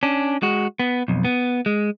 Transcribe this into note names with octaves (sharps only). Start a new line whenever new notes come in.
C#4 D4
G#3 F#4
B3
B1 F2
B3
G#3